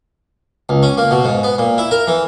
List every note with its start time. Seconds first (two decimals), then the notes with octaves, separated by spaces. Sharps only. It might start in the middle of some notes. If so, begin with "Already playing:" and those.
0.69 C#2
0.83 C#4
0.98 A#3
1.11 B2
1.25 G#2
1.43 B3
1.58 A#2
1.78 E4
1.91 A#4
2.07 E3